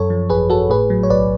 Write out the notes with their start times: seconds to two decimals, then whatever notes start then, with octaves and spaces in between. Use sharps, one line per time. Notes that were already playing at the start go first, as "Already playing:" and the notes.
Already playing: F#2 A4 C#5
0.10 F3
0.30 G#1 G#4 B4
0.50 G#1 F#4 A4
0.70 A2 G#4 B4
0.90 F#3
1.03 C#5
1.10 B1 B4 D5